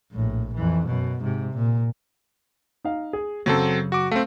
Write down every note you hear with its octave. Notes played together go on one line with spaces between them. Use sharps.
A#1 A2
F2 E3
F#2 B2
G#2 C3
A#2
D#4 F5
G#4
F#2 C#3 F#3 C4 A4
F#4 D6
A3 C4 F5